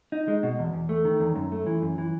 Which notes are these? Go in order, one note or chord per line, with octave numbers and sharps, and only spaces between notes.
D#4
G#3
B2
E2
E2
A3
D#3
E2
F#2
A3
E3
F#2
E3